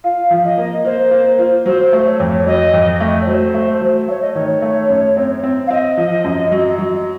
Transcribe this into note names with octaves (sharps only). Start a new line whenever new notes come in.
F4 F5
F3
D#5
A#3
A#3 C5
A#3
F4
F#3 C5
A3
C#5
F2
C#5
F#3 D#5
F2
A3
C#5
F#3 C5
A3
F#3
A3 C#5
D#5
D#3 C#5
A3
F#2
C4
C4
F5
C4 D#5
F3
F#2
F#3
F#3